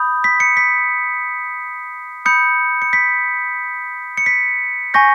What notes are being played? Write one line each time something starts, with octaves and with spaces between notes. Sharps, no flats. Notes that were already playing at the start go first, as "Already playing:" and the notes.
Already playing: B5 D#6 G6
B6
C#7
B6
B5 D#6 G6 C#7
C#7
B6
C#7
B6
G#5 C#6 G6 A#6